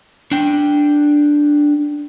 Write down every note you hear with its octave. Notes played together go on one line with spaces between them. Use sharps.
D4 G5